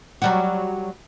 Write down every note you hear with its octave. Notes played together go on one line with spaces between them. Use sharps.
F#3 G3 F#4